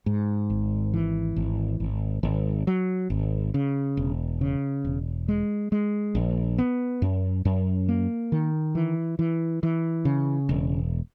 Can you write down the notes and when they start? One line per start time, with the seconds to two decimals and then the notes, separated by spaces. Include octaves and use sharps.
0.06 G#2
0.50 G#1
0.93 E3
1.36 G#1
1.80 G#1
2.23 G#1
2.67 F#3
3.10 G#1
3.54 C#3
3.97 E1
4.41 C#3
4.85 E1
5.28 G#3
5.72 G#3
6.15 A#1
6.58 B3
7.02 F#2
7.45 F#2
7.88 A#3
8.32 D#3
8.75 E3
9.19 E3
9.63 E3
10.05 C#3
10.49 E1